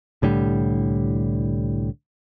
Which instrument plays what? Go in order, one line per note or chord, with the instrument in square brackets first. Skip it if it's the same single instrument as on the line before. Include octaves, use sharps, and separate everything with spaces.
[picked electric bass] C2 A2 D3 G3